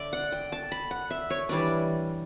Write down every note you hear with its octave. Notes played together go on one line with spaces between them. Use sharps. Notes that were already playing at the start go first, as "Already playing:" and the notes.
Already playing: D3 D5 E5
F#5
G5
A5
B5
F#5
E5
C#5
E3 G3 D4 D5